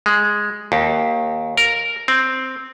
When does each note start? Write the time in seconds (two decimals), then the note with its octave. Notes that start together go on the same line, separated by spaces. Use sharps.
0.06 G#3
0.72 D#2
1.57 A#4
2.08 C4